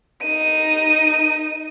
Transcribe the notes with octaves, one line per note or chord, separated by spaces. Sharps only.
D#4 D#7